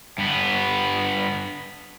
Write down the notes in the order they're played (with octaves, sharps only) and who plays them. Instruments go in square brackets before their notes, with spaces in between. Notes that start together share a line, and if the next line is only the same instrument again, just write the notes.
[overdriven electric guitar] G2 B3